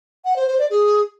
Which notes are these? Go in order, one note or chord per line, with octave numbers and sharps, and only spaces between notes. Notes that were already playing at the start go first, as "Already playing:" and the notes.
F#5
C5
C5
D5
G#4